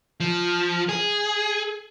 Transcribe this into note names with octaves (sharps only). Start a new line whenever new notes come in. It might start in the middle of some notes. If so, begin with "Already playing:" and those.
F3
G#4